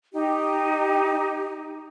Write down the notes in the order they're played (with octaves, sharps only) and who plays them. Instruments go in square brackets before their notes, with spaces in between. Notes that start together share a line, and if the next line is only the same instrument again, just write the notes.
[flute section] D#4 G4